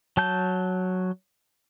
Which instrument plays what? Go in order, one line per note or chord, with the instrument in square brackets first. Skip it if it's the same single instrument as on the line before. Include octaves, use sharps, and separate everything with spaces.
[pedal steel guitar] F#3 A5 G6